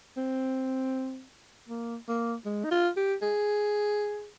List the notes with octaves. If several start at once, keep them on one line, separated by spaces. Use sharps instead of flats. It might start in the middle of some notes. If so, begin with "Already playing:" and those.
C4
A#3
A#3
G#3
D#4
F4
G4
G#4